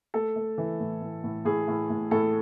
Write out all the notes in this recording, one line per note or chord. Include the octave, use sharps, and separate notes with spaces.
A3 A4
A3
E3
A2
A2
A2
A2 G#4
A2
A2
A2 A4